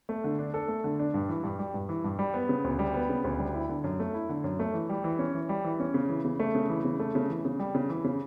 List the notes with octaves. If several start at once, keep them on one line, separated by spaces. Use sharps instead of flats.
A3
D3
D4
A4
A3
D3
D4
G2
E3
G2
G3
G2
E3
G2
G3
B3
C#3
D2
G3
B3
C#3
D2
G3
E4
D3
F#2
A3
E4
D3
F#2
A3
E3
G3
E3
C#4
E3
G3
E3
C#4
C#3
E3
C#3
A3
C#3
E3
C#3
A3
C#3
E3
C#3
G3
C#3
E3
C#3